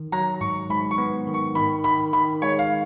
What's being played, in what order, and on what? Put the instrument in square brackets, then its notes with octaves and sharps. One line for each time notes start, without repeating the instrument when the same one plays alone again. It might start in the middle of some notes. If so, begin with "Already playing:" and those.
Already playing: [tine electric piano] D#3
[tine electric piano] F#3 [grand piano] A#5
[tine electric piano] G#2 [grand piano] C#6
[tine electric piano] G#2 [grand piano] B5
[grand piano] C#6
[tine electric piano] B3
D#3
[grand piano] C#6
[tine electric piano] D#3 [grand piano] B5
[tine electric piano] D#3 [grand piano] B5
[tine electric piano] D#3 [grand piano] B5
[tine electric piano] G#3 [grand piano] C#5
[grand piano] F5